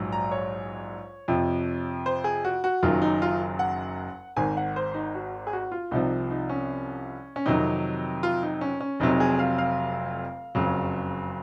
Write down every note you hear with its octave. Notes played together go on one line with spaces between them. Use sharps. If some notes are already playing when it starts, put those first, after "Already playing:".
Already playing: A#1 G#2 F#3
A#5
C#5
F2 C3 F3
C5
G#4
F#4
F#4
F#1 F#2 D#3 F#3 F4
D#4
F4
F#5
G#1 G#2 D#3 G#5
F#5
C5
D#4
F#4
G#4
F#4
F4
C2 C3 F3 D#4
D#4
C#4
C#4
F2 C3 D#3 F#3 D#4
F4
D#4
C#4
C#4
F1 F2 C3 F#3 D#4
G#4
F5
F5
F#1 F2 C#3 F#3